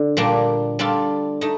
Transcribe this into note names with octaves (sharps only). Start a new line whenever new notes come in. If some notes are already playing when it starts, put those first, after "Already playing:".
Already playing: D3
A#2 G3 A#3 D4
G3 D4 F4 A4
A3 D#4